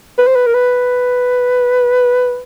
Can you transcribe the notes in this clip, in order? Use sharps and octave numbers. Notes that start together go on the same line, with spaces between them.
B4
C5
B4
A#4
B4